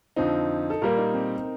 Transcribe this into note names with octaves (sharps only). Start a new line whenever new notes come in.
F2 D3 F3 C4 D#4
A4
A#2 G3 A#3 A#4
D#4
C4